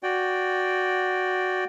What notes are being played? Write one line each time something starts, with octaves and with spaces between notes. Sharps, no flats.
F#4 D5 G5